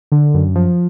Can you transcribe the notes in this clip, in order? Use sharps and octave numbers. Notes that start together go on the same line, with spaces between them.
D3
F#2
F3